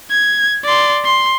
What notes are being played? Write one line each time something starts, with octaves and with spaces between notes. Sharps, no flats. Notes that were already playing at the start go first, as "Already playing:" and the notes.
G#6
D5 C6
C6